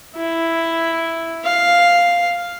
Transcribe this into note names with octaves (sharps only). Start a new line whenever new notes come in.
E4
F5